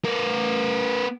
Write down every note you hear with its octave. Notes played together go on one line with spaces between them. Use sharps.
B3 A#4